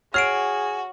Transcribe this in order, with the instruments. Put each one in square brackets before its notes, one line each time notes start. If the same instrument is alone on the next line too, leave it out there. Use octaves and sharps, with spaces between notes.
[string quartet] F#4 [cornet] G#4 [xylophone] C#5 C7 D7 [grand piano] F6